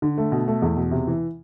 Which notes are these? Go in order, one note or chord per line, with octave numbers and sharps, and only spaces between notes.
D3
A3
B2
A3
E2
B2
C3
E3